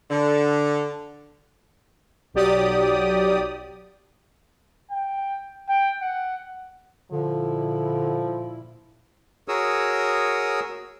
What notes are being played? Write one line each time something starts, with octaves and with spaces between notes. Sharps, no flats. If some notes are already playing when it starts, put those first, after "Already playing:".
D3
B1 F#3 G4 D5 D#6
G5
G5
F#5
A#2 D3 F3 E4
F#4 G#4 A#4 C#5 D#6 E6